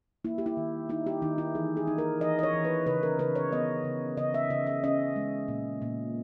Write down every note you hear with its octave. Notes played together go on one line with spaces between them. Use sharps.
A#3 E4
G4
E4
D#3
D#4 E4
G4
D#3 D#4
E4
E3 G#4
G#4
D#4
A#4
E3 D#5
D#5
C#5
E3
B4
C#3 B4
A#4
C#3 B4
C#5
B3 D#5
C#3
C#3 D#5
E5
C#3 D#5
E5
C#4 D#5
G#3
A#2
A#2